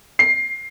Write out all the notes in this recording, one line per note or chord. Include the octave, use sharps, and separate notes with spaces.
C7